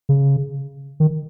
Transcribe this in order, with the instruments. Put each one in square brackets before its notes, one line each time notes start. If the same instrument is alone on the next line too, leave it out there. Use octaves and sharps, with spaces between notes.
[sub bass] C#3
D#3